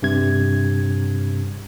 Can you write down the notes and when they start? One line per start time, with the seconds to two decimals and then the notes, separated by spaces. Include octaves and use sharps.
0.02 G2 C3 G#6